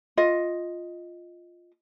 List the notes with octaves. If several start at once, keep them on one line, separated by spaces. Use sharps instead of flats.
F4 D#5